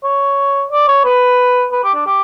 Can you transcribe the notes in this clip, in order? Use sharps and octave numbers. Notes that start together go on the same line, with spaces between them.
C#5
D5
C#5
B4
B4
G4
D4
G4